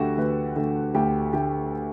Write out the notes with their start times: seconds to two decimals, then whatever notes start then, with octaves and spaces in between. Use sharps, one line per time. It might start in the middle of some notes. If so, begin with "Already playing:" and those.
Already playing: D2 D3 A3 F#4 G4
0.18 D2 B4
0.56 D3 A3
0.94 D2 G4
1.33 D3 A3 G4